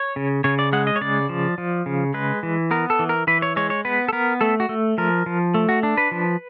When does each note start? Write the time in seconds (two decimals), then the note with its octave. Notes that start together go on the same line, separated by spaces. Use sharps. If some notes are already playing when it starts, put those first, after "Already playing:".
Already playing: C#5
0.16 C#3
0.44 C#3 C#5
0.59 D5
0.73 G#3 F#5
0.87 D#5
0.96 C#5
1.01 C#3 D5
1.29 F3
1.58 F3
1.86 C#3
2.14 G#3 B4
2.43 E3
2.71 B3 A#4
2.90 A4
2.99 E3
3.09 A#4
3.27 E3 B4
3.42 C#5
3.56 G#3 C#5
3.70 C#5
3.85 B3 B4
4.08 A4
4.13 B3 A#4
4.41 A3 A4
4.60 F#4
4.69 A3
4.98 F3 A#4
5.26 F3
5.54 A3
5.69 F#4
5.83 D4
5.97 B4
6.11 F3